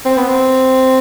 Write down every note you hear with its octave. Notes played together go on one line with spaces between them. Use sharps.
C4
B3
C4